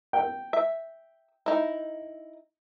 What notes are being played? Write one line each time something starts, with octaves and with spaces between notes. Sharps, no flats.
G5
E5
D#4 E4